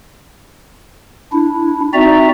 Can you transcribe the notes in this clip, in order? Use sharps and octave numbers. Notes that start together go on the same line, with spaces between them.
D4 E4
C4 D#4 F#4 D5 E5 A#5